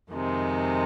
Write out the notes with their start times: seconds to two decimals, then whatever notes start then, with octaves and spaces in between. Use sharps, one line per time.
0.11 F2 C3 D#3 G#3